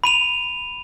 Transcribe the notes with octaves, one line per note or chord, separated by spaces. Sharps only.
B5 D#7 F7